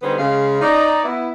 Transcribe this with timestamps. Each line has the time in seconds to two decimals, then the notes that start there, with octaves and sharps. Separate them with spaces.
0.02 D3 G3 B3 D#4 G#4 C5
0.18 C#3 G#3 F5
0.61 D#4 D5
1.04 B3 E4